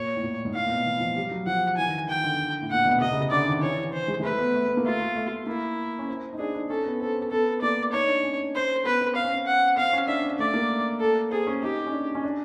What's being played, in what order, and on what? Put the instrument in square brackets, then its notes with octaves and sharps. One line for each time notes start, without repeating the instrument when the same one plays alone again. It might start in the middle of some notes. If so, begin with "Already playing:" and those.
Already playing: [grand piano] A#2 [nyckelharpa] C#5
[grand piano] A2
A#2
G#2
[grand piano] A2 [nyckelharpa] F5
[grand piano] A#2
B2
E3
F3
G3
F#3
[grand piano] F3 [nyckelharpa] F#5
[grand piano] E3 [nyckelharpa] G#5
[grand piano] D#3
E3
[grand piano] D#3 [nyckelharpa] G5
[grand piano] D3
A2
[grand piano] A#2 [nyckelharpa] F#5
[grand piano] B2
[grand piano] C3 [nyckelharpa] D#5
[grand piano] C#3
C3
[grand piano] D3 [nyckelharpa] D5
[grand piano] D#3
[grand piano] E3 [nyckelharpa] C#5
[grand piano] E3
[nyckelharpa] C5
[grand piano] G#3
G#3
[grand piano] A3 [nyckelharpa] B4
[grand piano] B3
A3
B3
A#3
[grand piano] A3 [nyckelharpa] F4
[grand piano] A3
A3
[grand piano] A#3 [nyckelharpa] E4
[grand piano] C#4
C4
D#4
[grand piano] D4 [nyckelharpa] G#4
[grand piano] D4
[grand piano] C#4 [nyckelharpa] A4
[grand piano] B3
[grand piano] C4 [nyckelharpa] A4
[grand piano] C4
[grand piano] B3 [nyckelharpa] A4
[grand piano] A#3 [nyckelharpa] D5
[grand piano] D#4 [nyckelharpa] C#5
[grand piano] D4
C#4
[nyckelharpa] C5
[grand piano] B3 [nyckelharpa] B4
[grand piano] C4
[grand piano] C4 [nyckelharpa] F5
[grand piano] C#4
C4
[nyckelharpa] F#5
[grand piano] C4 [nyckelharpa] F5
[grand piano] C#4
[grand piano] D4 [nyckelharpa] E5
[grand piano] D4
[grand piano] A3 [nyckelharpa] D5
[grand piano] A#3
[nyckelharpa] A4
[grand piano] C4 [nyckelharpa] G#4
[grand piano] C#4
[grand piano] D#4 [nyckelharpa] G4
[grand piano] C#4
D4
C#4
D4